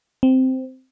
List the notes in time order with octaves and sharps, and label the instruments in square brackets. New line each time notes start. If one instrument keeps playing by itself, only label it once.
[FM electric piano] C4